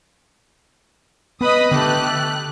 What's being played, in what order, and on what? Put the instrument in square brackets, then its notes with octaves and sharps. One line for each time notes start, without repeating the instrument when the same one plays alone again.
[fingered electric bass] B3 [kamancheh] B4 [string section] D#5 B5 D#6
[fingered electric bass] D3 B3 [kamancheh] A3 G4 [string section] F#6